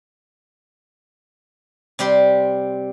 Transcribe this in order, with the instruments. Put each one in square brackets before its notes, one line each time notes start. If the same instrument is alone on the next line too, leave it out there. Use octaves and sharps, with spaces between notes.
[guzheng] C3 G3 G4 C6